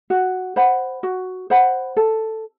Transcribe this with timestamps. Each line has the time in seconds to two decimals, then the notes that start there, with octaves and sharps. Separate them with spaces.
0.10 F#4
0.56 C5 F#5 B5
1.03 F#4
1.50 C5 F#5 B5
1.96 A4